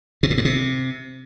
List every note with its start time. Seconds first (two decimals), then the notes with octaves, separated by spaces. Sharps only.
0.23 B2
0.30 A2
0.38 G#2
0.45 C3